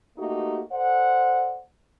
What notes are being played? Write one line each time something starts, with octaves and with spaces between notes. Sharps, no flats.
A3 A#3 D#4 F#4 G4
A4 C5 D5 F#5